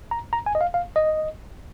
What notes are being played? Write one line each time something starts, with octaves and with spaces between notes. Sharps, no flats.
A#5
A#5
G#5
D#5
F5
F5
D#5